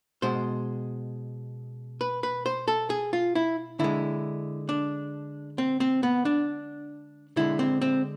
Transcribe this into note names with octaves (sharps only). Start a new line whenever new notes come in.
B2 G#3 C5
B4
B4
C5
A4
G#4
F4
E4
D3 G#3 E4
D4
C4
C4
B3
D4
D3 G#3 E4
C4
C4